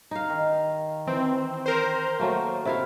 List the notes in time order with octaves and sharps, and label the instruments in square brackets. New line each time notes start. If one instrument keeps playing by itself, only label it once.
[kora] D#4 F5
[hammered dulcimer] D#3
[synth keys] E3 C4
A#4 C5
[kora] F#3 A3 A#3
[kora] C3 E4 F5 [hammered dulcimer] E5